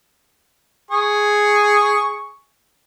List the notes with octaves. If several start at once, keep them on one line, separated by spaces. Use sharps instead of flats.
G#4 C#6